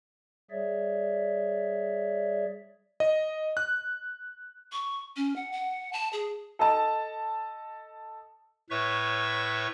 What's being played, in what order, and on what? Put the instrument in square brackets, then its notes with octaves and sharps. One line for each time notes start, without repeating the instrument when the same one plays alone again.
[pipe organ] G3 G#4 C#5 D5 E5
[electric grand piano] D#5
F#6
[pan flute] C#6
C#4
F#5
F#5
A5
G#4
[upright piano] A4 D#5 A5
[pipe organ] A2 B4 C#5 E5 C#6